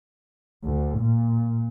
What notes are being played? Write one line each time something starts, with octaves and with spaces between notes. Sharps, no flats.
D2
A#2